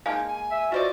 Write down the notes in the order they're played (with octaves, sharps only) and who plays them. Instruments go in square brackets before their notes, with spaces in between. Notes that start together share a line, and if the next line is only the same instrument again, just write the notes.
[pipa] G#3 A#3 [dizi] D#4 [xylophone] F5 A5
[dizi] G#5
[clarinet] E5
[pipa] F4 C5 D5 [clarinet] F#4 [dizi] D#5